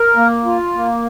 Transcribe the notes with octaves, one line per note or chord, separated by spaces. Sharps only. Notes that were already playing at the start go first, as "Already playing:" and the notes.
Already playing: A#4
A#3
F4
A#3